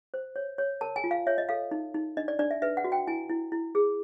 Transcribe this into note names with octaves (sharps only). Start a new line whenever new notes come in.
C5
C#5
C#5
A#4 A5
G#5
F4
F5
C#5 E5
D#5
A4 F5
D#4
D#4
D4 D#5
D5
D4 D5
E5
B4 E5
F#5
F#4
G5
E4 G#5
E4
E4
G#4